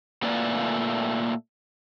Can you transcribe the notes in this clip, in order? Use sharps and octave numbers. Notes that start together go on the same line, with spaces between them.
A#2 A3 A#3 B4 D5